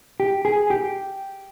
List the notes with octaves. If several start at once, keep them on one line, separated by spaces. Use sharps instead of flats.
G4
G#4
G4